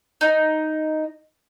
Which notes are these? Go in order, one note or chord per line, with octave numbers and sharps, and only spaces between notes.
D#4